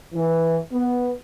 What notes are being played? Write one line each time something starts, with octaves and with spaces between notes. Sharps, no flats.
E3
B3